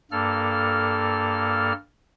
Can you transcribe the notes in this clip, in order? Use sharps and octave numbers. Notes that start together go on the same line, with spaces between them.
G2 A#3 A4 F6